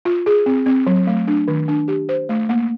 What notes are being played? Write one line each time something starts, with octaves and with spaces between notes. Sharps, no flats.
F4
G#4
C4
C4
F#3
A3
D4
D#3
D4
G4
C5
A3
A#3